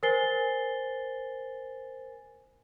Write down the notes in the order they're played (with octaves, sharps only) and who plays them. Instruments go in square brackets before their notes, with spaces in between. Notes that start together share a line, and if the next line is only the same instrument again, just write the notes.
[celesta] A#4 C5 G#5 A6 C7 G7